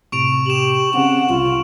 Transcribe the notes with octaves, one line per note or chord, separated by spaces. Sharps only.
A2 C3 C#6 D7 F7
G4 E7 F#7
C#3 C4 C#4 F#5
C2 F4